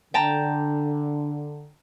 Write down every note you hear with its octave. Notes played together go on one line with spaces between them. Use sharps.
D3 G5 A5 A#5